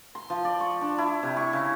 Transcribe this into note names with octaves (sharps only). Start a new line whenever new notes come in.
C6
F3
D5
C#6
D4
E4
C3
C#6
C#3